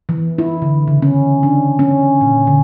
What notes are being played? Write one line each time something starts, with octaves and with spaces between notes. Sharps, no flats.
E3
E4
D3
C#3
C#4
D4
C#4
A#2
D3